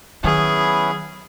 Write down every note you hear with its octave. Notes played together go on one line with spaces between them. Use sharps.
D#3 F#3 B3 C#4 E4 G#4